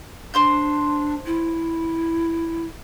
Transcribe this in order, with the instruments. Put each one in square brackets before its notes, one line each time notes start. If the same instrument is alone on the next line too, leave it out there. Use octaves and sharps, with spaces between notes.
[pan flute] D4 [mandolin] C5 C6 G6
[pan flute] E4